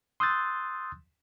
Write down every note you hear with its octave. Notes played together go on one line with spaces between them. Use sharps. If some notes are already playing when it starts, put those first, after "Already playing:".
C6 D#6 E6 F#6 G6 A6